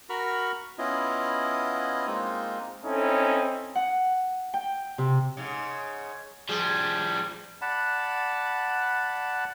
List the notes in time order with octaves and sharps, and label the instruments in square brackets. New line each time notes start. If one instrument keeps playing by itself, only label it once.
[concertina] F#4 A#4 B5 C#6 F6
B3 C#4 E4 F4 D#5
G#3 A#3 C4 D#4 F4
[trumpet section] C4 C#4 D#4 E4 A4
[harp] F#5
G5
C3
[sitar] G#2 C#3
[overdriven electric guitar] F3 G3 [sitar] G#4
[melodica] D5 F#5 A5 B5